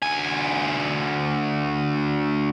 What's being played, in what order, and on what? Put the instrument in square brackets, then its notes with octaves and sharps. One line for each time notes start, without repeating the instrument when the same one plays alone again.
[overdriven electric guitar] D2 G#5